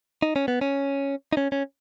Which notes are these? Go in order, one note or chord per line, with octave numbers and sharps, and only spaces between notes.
D#4
C#4
B3
C#4
D#4
C#4
C#4